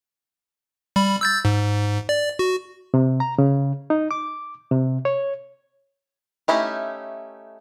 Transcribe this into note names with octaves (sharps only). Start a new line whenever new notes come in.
G3 B5
E6 G6 A6
G#2
D5
F#4
C3
A#5
C#3
D#4
D6
C3
C#5
A3 C#4 D#4 E4 G4